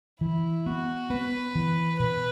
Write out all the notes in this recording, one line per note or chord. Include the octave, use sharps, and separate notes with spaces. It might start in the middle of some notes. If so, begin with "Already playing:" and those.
E3 E4
B3 F#4
B3 B4
E3
B2 B4